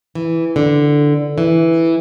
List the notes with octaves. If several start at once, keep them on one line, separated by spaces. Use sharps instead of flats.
E3
D3
E3